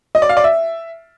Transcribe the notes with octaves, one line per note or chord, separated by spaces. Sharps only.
D#5
D5
F5
D5
E5